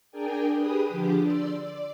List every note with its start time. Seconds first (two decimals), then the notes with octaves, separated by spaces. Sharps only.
0.11 D4 G#4 A#4 D5 G5 G#5
0.55 G4 G#4 B4 B5 D#6
0.89 D3 F3 D4 G4 D6
1.22 D5 C6 E6
1.59 D5